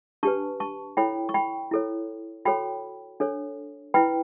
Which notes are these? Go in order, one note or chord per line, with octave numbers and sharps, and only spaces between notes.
D4 G4 B4 A5 C#6
A5 C#6
E4 A4 C#5 G5 B5
C#6
G5 B5
E4 A4 C#5
F#4 A4 C#5 G5 B5
D4 A4 C#5
E4 B4 G5 B5